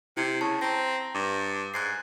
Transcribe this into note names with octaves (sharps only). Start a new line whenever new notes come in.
C3 E4 G#6
C#3 A5
C4 A#5 A#6
G2
G#2 F#6 G#6 C7